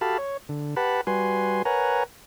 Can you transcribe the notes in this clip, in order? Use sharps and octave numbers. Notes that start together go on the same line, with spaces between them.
F#4 G4 A4 F5 A5 B5
C#5
D3
G4 B4 F#5 A5 B5
G3 F#4 B4 G#5 C6
A#4 B4 C#5 F#5 G#5 A#5